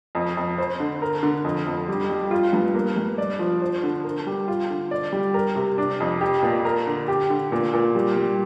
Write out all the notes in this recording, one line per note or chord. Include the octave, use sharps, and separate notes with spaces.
F2
F2
C5
D3
A#4
D3
F2
F2
G3
G3
F4
G2
A#3
G2
D5
F3
C5
D3
A#4
G3
F4
D3
D5
G3
A#4
C3
D4
F2
G4
A#2
A#4
D3
G4
D3
A#2
A#2
G3
G3